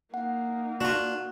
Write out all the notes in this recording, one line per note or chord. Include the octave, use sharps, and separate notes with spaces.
A#3 D#4 F#5
D4 F4 F#4